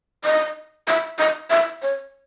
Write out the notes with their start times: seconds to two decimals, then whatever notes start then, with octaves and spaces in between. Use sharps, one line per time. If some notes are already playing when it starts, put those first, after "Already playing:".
0.25 D#5
0.88 E5
1.19 D#5
1.50 E5
1.82 C#5